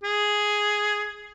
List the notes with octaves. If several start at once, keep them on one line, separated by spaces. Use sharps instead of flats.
G#4